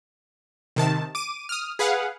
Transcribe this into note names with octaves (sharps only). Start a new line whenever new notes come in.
C3 D#3 A5
D6 D#7
D#6 F6
G#4 B4 F5 F#5